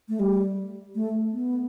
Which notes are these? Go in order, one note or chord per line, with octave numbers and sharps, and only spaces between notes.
A3
G3
A3
B3